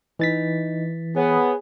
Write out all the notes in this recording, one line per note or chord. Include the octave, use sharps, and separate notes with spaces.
E3 D#4 A6 B6
B3 G#4 C#5